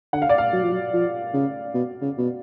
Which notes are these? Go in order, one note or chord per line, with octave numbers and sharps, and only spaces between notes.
D3 F#5
F5
D5
F5
F#3
F3
F#3
F3
C#3
B2
C#3
B2